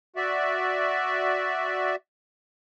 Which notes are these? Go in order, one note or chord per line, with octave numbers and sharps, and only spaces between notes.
F#4 D5 E5